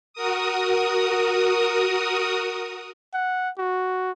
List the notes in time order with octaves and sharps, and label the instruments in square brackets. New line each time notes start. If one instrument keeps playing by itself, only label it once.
[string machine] F#4 A#4 D#6
[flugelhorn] F#5
F#4